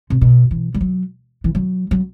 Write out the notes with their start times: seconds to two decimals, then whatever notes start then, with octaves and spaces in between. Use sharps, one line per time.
0.10 C3
0.21 B2
0.51 E3
0.74 G3
0.81 F#3
1.44 E3
1.55 F#3
1.91 F#3